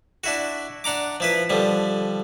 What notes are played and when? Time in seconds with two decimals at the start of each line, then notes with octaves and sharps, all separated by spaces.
0.24 D4 E4 F#4
0.84 D4 F#5 A#5 D6
1.20 F3 E4 B4
1.50 D3 F3 G3